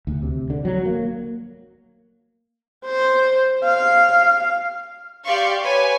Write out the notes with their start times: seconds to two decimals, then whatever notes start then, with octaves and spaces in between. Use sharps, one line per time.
0.07 D2
0.23 C3
0.50 D3
0.65 F#3
0.86 A#3
2.86 C5
3.64 F5
5.24 G4 D5 F5 C6 C#6
5.63 B4 C#5 G#5